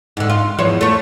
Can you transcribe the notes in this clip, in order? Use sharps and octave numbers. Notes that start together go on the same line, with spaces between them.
G#2 D3
F4
E2 F3 C#5
A3 C#5